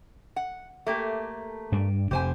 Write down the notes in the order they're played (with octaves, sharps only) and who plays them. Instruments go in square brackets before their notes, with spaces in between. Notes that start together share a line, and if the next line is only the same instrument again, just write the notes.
[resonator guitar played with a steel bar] F#5
A3 A#3 G4
[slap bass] G2 D4
[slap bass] F1 [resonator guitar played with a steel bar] G4 C5 G#5